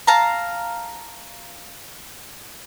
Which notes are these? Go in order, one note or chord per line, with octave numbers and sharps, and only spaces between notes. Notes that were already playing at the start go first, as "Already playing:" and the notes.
F5 A5 A#5